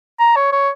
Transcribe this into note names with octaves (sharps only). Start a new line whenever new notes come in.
A#5
C#5
C#5